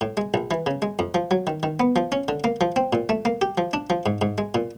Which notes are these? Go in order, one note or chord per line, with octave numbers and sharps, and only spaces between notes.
A2
G#3
A#1
E3
C#3
G#3
F2
F3
F#3
D#3
D#3
B3
F3
C#4
D3
A#3
F3
C4
A#2
A3
A#3
G4
F3
D4
F3
G#2
G#2
G#3
A#2